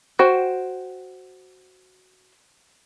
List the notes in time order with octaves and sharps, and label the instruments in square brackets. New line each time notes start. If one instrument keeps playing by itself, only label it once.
[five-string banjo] F#4 C5 G5